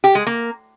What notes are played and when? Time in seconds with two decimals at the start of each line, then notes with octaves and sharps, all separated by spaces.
0.04 G4
0.15 G#3
0.27 A#3